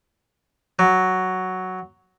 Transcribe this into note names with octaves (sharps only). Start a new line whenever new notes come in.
F#3